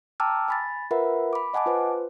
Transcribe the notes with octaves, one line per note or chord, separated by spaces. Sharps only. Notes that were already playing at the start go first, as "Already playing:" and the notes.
G5 A5 A#5 D6 E6 F6
G#5 B5 A6
F4 A#4 B4 E5 F#5 B5
B5 D6
D#5 F#5 G#5 A5 D6
F4 B4 C5